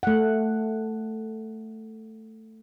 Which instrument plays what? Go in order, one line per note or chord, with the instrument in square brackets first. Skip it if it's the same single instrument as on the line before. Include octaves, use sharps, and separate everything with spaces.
[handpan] A3 F#5